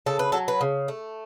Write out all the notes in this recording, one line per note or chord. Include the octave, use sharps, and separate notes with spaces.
C#3 A4
B4
F#3 A4
B4
C#3
A3